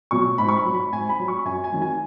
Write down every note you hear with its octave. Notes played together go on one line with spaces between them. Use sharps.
B2 F#3 C#6
G#2 B5
C#6
B5
F#3
B5
G#2 G#5
B5
F#3
C#6
F#2 G#5
G#5
D#3 F#3
G#5